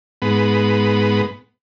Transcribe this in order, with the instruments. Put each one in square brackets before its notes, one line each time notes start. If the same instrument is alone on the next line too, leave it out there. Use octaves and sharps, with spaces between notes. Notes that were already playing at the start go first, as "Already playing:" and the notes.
[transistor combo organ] G#2 B3